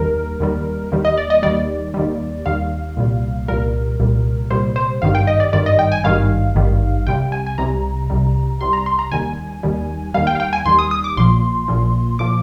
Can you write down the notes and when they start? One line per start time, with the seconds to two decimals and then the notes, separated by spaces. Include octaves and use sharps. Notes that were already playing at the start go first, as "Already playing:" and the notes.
Already playing: D#2 D#3 G3 A#4
0.40 D#2 D#3 G3
0.92 D#2 D#3 G3
1.05 D#5
1.17 D5
1.30 D#5
1.43 D#2 D#3 G3 D5
1.94 D#2 D#3 G3
2.46 D#2 D#3 G3 F5
2.97 C2 A#2 G3
3.48 C2 A#2 G3 A#4
4.00 C2 A#2 G3
4.51 C2 A#2 G3 C5
4.76 C5
5.02 G#1 G2 D#3 G3 F5
5.15 G5
5.27 D#5
5.40 D5
5.53 G#1 G2 D#3 G3 D5
5.66 D#5
5.79 G5
5.92 G#5
6.04 G#1 G2 D#3 G3 F5
6.55 G#1 G2 D#3 G3
7.07 C2 C3 G3 G5
7.32 G#5
7.46 G#5
7.58 C2 C3 G3 A#5
8.10 C2 C3 G3
8.61 C2 C3 G3 C6
8.73 A#5
8.86 C6
8.99 A#5
9.11 D#2 D#3 G3 G#5
9.63 D#2 D#3 G3
10.14 D#2 D#3 G3 F5
10.27 G5
10.35 F5
10.40 G5
10.53 G#5
10.65 D#2 D#3 G3 C6
10.79 D#6
10.91 D#6
11.04 D6
11.17 A#1 A#2 F3 C6
11.68 A#1 A#2 F3
12.19 A#2 F3 D6